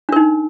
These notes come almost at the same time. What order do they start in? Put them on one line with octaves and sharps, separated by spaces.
D4 A#4 D#4